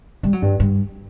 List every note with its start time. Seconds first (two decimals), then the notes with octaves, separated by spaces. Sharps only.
0.23 G3
0.33 F#3
0.42 G2
0.60 G2